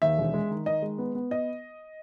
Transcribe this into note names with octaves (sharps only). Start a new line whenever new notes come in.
D#2 E5
E1
G#3
D#3
D#3 D#5
G#3
B3
B3
D#5